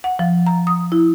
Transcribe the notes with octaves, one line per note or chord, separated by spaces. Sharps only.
F#5
F3
A#5
D#6
E4